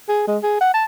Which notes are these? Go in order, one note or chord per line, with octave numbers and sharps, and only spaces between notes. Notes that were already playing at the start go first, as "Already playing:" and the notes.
G#4
G#3
G#4
F#5
A5